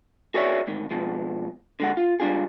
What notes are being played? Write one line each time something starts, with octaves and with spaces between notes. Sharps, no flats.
F#4 G#4 A#4 C#5 D5 E5
D2 G#2 D#3
G#2 B2 F3 G#3
D3 G#3 F#5
F4
C#2 G3 D4 F4 G#4